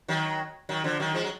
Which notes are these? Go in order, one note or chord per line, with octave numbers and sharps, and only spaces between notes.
D#3 F#3
D#3 F#3
D3 F3
D#3 F#3
F3 G#3
F#3